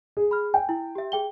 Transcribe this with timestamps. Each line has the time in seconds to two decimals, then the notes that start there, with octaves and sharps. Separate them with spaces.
0.17 G#4
0.31 B5 F6
0.54 G5 G#5
0.69 E4
0.95 G4 E5
1.12 G#4 G5 G7